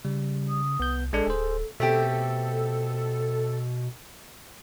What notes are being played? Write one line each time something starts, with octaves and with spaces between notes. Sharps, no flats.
C#3 G3
D#6
C2 B3 G6
A1 G#3 D4 A4
D1 G#4 C5
B2 A3 C4 G4 A4